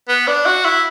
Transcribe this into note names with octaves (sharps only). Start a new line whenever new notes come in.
B3
D4
F#4
E4